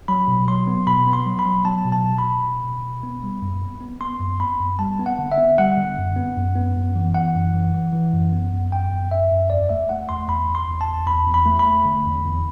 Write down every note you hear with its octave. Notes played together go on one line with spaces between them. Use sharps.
F#3 B5
B2
F#3 C6
B3
B2 B5
B3
C6
F#3
B5
F#3
F#3 A5
B2
A5
B2
B5
B2
B2
B2
B2
B3
G3
F#2
B3
B3
B3 C6
F#2
B3 B5
F#2
G3 A5
B3
F#5
D3
E5
B3
G3 F#5
D3
F#2
B3
F#2
B3
F#2
E3
E3 F#5
F#2
E3
E3
E3
F#2
B3
F#2
F#2 G5
F#2
F#2 E5
F#2
E2 D5
A3 E5
A3 F#5
E2 C6
E2 B5
E2
C6
E2
A5
E2
E2 B5
E2
B5
A3
B5
A3
D3
E2
E2